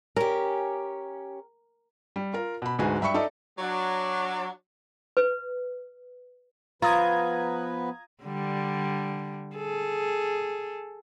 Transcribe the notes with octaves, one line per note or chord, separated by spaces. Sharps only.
C#4 G4 A#4
G3
F4 A#4
B2 B5
D2 G#2 G#3 F#4 B4 G#5
G2 E5 G5 B5 C#6 C#7
D#4 A4 D5 E5
F#3 D4
B4
F3 B3 F4 B4 A#5 D#6 G#6
D3 G3
G#4 A4